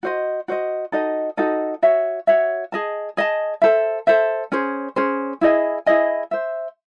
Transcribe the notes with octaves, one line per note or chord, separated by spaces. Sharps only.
F#4 C5 D#5
F#4 C5 D#5
D#4 F#4 A4 D#5
D#4 F#4 A4 D#5
F#4 C#5 E5
F#4 C#5 E5
G#4 D#5 A5
G#4 D#5 A5
A4 C5 E5
A4 C5 E5
C#4 G#4 C5
C#4 G#4 C5
E4 G#4 D#5 G#5
E4 G#4 D#5 G#5
C5 E5